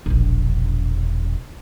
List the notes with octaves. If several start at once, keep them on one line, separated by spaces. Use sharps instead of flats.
E1 A#1